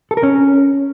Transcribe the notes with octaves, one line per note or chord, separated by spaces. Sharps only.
A4
A#4
C#4